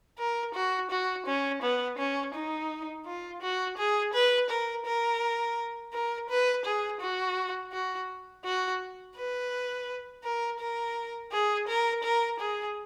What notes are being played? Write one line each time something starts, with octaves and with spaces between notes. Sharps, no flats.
A#4
F#4
F#4
C#4
B3
C#4
D#4
F4
F#4
G#4
B4
A#4
A#4
A#4
B4
G#4
F#4
F#4
F#4
B4
A#4
A#4
G#4
A#4
A#4
G#4